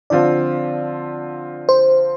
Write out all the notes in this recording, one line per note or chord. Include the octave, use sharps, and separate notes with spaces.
D3 F3 C4 F4 D5
C5